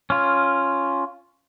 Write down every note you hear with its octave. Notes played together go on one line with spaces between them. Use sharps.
C#4 F4